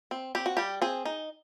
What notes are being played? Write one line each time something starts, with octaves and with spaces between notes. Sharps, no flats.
C4
C4 G4
F#4
G3 G4
C4 G#4
D#4